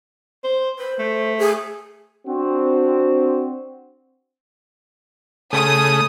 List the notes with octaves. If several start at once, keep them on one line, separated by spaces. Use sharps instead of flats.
C5
B4 C5
A3
G#4
C4 D4 F#4
C#3 A3 G#4 D#6